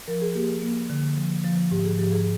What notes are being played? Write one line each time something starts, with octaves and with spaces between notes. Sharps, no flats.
F3 A#4
G#4
A#3 G4
A#3
D3
F3
F3
G#2 G4
G#4
F3 G4
G#4